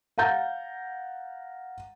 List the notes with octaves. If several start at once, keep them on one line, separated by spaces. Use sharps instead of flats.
F5 F#5 A#5 G6 A6